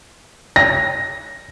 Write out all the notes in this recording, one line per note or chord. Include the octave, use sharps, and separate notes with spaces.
A#6